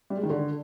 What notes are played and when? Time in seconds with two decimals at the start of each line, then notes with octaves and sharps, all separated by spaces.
0.10 G3
0.17 G#3
0.23 D#3
0.30 D3